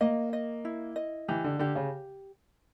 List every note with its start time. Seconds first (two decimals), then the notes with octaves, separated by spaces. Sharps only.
0.01 A#3 D#5
0.33 D#5
0.65 E4
0.96 D#5
1.28 E3 G4
1.44 D3
1.59 D3 G4
1.76 C#3